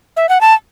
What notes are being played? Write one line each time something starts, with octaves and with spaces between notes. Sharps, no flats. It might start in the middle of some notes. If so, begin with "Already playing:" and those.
E5
F#5
A5